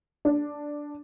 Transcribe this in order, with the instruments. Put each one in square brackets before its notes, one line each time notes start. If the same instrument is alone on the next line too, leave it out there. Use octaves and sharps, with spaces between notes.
[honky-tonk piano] D4